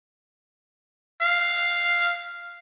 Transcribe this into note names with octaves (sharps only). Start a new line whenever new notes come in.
F5